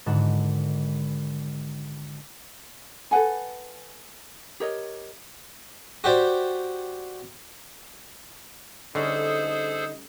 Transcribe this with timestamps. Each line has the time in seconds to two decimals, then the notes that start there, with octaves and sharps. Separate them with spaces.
0.06 G#1 G#2 D3 A4 F#5 E7
3.11 A4 B4 F#5 G#5
4.60 G4 A#4 C#5 D#5
6.04 F#4 G4 C5 D5
8.95 D3 G3 A3 C#4 D#4 G#4 A4 C5